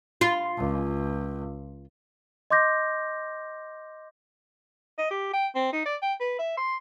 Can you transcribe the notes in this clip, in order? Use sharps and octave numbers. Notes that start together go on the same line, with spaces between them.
F4
C#2
D#5 C6 D6 G6 A#6
D#5
G4
G5
C4
D#4
D5
G5
B4
E5
C6